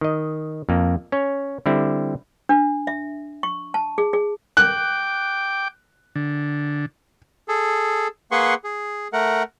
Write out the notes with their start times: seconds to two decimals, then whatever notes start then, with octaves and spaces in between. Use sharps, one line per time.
0.01 D#3 D#5
0.69 F2 A#3
1.12 C#4 C#5
1.66 D3 G3 C4 E4
2.49 D4
2.87 E5
3.43 C#6
3.74 A5
3.98 G#4
4.13 G#4
4.57 G5 D6 F#6
6.16 D3
7.48 G#4 A4
8.32 A#3 G#4 B4 F#5 C6 C#6
8.64 G#4
9.13 A3 A#4 F#5